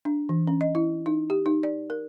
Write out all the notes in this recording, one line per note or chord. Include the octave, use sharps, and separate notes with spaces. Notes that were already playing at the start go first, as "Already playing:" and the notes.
D4
E3
C#4
D#5
E4
D#4
G4
D#4
D5
A#4